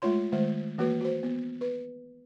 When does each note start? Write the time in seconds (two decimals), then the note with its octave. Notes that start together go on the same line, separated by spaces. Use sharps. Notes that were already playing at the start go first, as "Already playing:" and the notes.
0.02 G#3 A3 F4 C#5 C6
0.32 D#3 G#3 A3 C5
0.78 E3 A#3 F#4 B4
1.01 F#4 C5
1.23 B3
1.61 B4